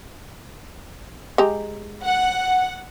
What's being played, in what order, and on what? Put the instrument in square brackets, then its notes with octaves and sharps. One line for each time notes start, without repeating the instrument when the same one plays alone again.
[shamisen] G#3 G4 A#5
[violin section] F#5